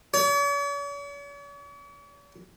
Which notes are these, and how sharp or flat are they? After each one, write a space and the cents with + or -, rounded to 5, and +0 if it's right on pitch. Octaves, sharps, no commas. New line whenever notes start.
C#5 +45